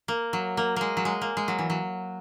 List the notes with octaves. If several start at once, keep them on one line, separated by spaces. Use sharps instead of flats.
A#3
F#3
A#3
G#3 A#3
F#3
G#3
A#3
G#3
F#3
E3
F#3